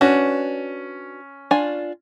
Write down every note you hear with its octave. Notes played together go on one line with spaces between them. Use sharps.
C#4 D4 F#4 B4
D4 F4 G#5